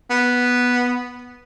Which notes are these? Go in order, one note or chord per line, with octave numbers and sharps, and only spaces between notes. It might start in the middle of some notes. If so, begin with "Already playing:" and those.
B3